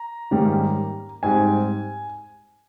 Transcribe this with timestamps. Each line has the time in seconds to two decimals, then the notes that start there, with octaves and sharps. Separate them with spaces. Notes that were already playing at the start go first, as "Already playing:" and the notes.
Already playing: A#5
0.31 G#2 D#3 G3 A#3 C#4
1.23 G#2 G3 C4 G#5